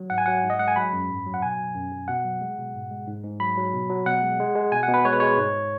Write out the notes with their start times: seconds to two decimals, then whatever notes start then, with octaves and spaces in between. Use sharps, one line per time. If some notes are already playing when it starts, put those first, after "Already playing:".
Already playing: F#3
0.10 G#2 F#5
0.18 G#5
0.26 F#3 F#5
0.44 G#2
0.50 D#5
0.59 G#3 F#5
0.68 G#5
0.76 F#3 B5
0.93 F#2
1.10 G#2
1.26 F#3
1.34 F#5
1.42 B2 G#5
1.58 B2
1.75 F#2
1.92 F#2
2.08 B2 F#5
2.25 F#3
2.41 G#3
2.58 B2
2.74 G#2
2.91 G#3
3.07 G#2
3.24 G#2
3.40 F#3 B5
3.57 F#3
3.73 B2
3.90 F#3
4.06 B2 F#5
4.23 G#3
4.40 G#3
4.55 G#3
4.72 B2 G#5
4.83 F#5
4.88 B2
4.94 B4
5.05 G#3 C#5
5.13 B4
5.20 G#3 C#5
5.37 G#2